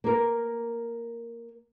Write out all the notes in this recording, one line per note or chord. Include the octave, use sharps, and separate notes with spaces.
A#3 A#4